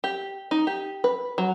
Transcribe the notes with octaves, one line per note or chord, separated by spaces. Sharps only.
G4
D#4
G4
B4
F#3